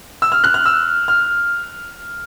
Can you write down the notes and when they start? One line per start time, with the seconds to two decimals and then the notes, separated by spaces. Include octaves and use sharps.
0.22 E6
0.32 F6
0.44 F#6
0.54 F6
0.66 E6
1.08 F6